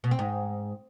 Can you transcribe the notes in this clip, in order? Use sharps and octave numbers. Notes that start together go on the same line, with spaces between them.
B2
C4
G#2